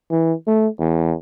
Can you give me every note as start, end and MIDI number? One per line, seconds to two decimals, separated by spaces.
0.11 0.33 52
0.47 0.68 57
0.80 1.14 40